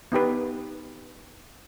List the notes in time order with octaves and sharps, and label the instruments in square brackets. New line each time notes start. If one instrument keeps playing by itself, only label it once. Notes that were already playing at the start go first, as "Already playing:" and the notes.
[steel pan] B3 D#4 G4 B4